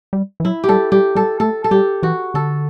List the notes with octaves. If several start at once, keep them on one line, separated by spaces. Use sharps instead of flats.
G3
E3
F#3 E4
G4
G3 A4
G3 G4
G3 A4
A3 A4
A4
G3 G4
E3 F#4
D3 A4